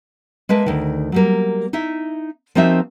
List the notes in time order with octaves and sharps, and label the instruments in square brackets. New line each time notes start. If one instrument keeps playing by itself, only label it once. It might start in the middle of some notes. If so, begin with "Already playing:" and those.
[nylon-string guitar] G#3 A#3 B4 E5 A5
D2 D#3
F#3 G3 A#3
D#4 E4 E5
F3 A#3 C4 D#4 F#4 E5